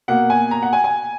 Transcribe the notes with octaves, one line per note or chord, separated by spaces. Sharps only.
B2 A#3 F#5
G#5
A#5
F#5
G#5
G#5